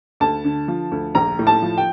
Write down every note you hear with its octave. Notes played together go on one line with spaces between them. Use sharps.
D2 A5
D3
F3
D2
A#1 A#5
A2
A5
F3
G5